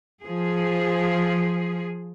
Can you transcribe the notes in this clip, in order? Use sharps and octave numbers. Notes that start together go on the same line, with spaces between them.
F3 G#4